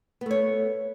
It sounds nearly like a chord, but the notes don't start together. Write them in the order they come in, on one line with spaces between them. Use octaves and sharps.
B3 A3 C#5